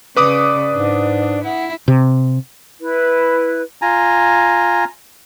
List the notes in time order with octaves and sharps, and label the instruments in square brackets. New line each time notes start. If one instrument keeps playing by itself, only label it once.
[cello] C#3 [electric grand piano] B4 D6 D#6 [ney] D5
[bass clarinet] G#2 [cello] D4
[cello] E4 [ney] F#5
[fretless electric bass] C3
[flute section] E4 B4
[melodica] F4 G#5 A#5